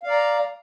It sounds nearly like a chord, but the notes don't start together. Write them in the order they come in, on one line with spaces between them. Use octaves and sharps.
F5 D5 A#5